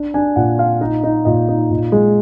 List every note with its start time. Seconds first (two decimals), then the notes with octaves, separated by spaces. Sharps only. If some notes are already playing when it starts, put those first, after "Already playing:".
Already playing: D4
0.14 D4 G#5
0.36 A#2 F#5
0.58 F4 F5
0.81 D#4 D#5
1.04 D#4
1.25 A#2 D#5
1.49 D#4
1.71 A#2
1.92 G#3